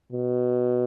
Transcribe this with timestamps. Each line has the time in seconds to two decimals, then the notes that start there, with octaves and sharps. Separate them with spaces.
0.12 B2